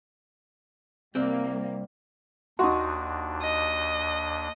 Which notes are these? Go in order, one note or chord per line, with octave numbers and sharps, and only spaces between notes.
C2 G3 A#3 C4
D#2 D4 D#4 F#4 C6 C#6
D#5